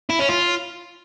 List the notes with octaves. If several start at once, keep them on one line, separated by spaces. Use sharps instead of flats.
E4
C#4
F4